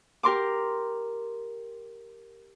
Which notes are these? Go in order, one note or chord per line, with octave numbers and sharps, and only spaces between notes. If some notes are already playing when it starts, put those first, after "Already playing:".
G4 A#4 C6 D6